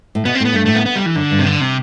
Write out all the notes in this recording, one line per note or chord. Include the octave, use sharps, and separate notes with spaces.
A2
B2 B3
C4
A2 B3
G2 A3
A2 A3
B3
B3
G3
E3
F#2 D3
G2
C3
D3
C3